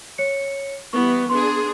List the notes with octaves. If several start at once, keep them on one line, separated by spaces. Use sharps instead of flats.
C#5 C#7
E3 G3 B3 C#6
B3 D4 G#4 C6